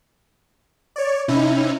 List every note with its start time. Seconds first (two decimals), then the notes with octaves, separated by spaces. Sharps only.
0.96 C#5 D5
1.28 C3 C#4 D#4 E4